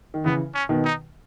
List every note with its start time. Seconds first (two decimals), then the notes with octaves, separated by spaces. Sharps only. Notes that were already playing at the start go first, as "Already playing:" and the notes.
0.14 D#3
0.24 C#3 E3 B3
0.54 C#4
0.69 B2 D#3
0.85 D#4